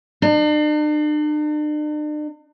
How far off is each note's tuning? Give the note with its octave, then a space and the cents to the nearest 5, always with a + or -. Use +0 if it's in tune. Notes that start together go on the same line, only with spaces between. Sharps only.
D4 +45